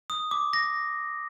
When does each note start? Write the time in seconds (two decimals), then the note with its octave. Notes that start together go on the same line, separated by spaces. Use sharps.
0.10 D#6
0.31 D6
0.53 A#6